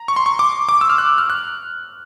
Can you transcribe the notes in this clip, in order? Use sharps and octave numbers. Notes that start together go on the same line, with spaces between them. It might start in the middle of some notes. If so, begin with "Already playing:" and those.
Already playing: A#5
C#6
C6
C#6
D6
D6
E6
F6
F#6
F6
F#6